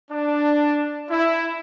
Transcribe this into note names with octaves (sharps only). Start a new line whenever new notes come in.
D4
E4